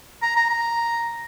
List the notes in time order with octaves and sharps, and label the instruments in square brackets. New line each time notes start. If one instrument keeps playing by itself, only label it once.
[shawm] A#5
A#5
A#5